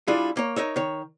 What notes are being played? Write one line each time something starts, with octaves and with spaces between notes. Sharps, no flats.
G3 D4 E4 F4 G#4
A#3 C#5
D#4 A#4 C#5 E5
D#3 C#5